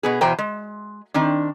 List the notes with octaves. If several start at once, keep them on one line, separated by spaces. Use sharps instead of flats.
B2 B3 G#4
E2 B2 E3 C5 G5 A#5
G#3
D#3 C4 D4